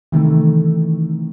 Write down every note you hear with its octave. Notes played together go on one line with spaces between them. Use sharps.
C3 D#3 E3 A3